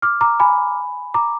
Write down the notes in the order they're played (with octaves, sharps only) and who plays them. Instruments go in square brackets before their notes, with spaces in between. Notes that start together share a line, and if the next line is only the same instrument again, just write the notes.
[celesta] D6 F6
A#5 D6
G#5 B5
A#5 D6